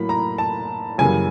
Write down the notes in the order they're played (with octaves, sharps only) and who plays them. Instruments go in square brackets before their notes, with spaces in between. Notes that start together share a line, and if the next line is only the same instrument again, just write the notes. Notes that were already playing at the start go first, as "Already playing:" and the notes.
Already playing: [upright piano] A2 F#3 A#3 B5
A#5
A5
F#2 C#3 E3 G3 A#3 G#5